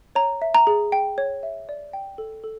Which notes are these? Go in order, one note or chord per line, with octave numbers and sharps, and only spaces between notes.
C#5 A#5
E5
A#5
G#4
G5
C#5
E5
D5
G5
A4
A4